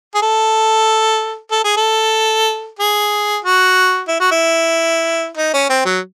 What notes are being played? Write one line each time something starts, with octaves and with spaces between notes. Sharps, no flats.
G#4
A4
A4
G#4
A4
G#4
F#4
E4
F#4
E4
D#4
C#4
C4
F#3